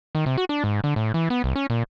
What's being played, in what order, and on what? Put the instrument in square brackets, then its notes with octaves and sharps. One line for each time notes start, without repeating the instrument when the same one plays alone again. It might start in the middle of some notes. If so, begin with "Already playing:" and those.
[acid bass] D#3
C3
F#4
D4
G#2
D3
A2
E3
B3
C2
C#4
A#2